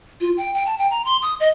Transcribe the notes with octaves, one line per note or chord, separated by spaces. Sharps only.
F4
G5
G5
A5
G5
A#5
C6
D#6
D#5